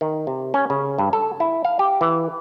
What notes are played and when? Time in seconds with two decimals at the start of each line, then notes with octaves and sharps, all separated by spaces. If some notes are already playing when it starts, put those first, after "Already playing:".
0.01 D#3
0.27 C3
0.54 C#4
0.70 C#3
0.98 G2
1.13 A4
1.40 E4
1.65 F5
1.79 G4
2.01 E3